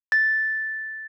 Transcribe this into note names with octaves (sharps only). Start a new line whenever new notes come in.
A6